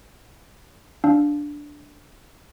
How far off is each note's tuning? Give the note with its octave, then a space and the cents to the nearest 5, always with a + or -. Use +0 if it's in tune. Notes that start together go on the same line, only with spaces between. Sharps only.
D4 +0 F5 +0